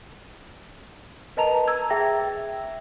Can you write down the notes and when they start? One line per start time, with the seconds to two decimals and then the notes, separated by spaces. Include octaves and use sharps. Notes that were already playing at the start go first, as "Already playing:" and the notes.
1.37 A#4 B4 D#5 A5 A#5 F7
1.67 A#5 E6 G#6
1.90 G#4 E5 G5 A#6